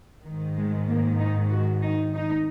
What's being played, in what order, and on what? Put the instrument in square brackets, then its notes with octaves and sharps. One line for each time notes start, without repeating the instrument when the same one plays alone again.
[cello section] D#3
G#2
G#3
A#3
D#4
F#4
D#4
D#4